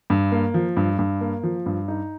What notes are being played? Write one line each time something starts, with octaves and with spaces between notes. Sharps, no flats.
G2
A#3
F3
G2
G2
A#3
F3
G2
D#4